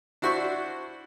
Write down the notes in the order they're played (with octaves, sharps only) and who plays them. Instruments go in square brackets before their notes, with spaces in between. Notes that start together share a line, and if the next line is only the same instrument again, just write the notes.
[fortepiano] D4 E4 F#4 C5 E5 C#6